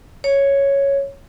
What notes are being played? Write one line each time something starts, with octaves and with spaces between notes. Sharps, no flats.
C#5